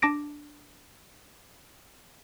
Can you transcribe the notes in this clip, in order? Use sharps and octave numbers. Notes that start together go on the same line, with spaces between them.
D4 A5 D6 A#6 D7